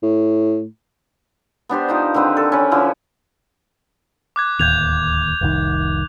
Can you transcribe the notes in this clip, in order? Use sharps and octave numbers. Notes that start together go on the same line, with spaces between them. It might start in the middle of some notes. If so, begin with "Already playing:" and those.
A2
B3 D4 G4 C5
F3 D#4 C5
D3 D#3 C4 B4
A4
C#4 A#4 B4
D3 F3 C#4 E4
D6 F#6 G#6
D1 D#2 G6 G#6 F7
F1 C2 D#3